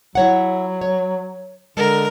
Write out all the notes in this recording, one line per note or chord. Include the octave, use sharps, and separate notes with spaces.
F#3 E4 C#5 F#5
C#5
D3 G#3 A#4